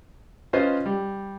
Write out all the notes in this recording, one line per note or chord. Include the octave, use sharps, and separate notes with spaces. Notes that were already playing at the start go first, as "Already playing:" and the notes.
C#4 F4 B4 C5 D#5
G3